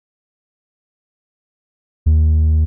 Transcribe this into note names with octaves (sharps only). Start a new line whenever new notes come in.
D#2